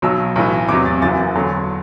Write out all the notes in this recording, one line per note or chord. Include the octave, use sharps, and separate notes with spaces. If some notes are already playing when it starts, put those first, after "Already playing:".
B1 B2 F#3 E6
B1 A2 E3
E2 C3 F#3 D6
A6
F#1 F#2 E3 A6
E2 D3 F#3